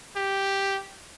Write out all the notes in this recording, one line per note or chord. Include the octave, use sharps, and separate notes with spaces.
G4